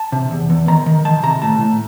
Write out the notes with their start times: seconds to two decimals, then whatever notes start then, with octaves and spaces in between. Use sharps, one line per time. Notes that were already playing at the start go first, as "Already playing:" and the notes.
Already playing: A5
0.12 C3
0.31 E2
0.50 E2
0.68 D#3 A#5
0.86 D#3
1.05 D#3 A5
1.23 C3 A#5
1.42 A2 A5
1.61 A2